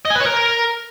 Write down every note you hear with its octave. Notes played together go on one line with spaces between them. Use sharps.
D#5
G#5
B4
C#5
A#4